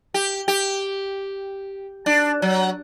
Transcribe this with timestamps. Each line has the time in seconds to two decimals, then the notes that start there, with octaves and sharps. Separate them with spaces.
0.14 G4
0.48 G4
2.06 D4
2.42 F#3